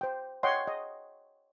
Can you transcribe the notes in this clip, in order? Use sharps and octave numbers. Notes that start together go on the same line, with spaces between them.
C5 G5
C#5 D#5 F#5 G5 C6
D#5